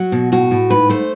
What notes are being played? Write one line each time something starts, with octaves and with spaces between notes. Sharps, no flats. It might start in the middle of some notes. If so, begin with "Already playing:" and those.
Already playing: F#3 F#4
B2
A2 F#4
A2
G#2 B4
A3 C5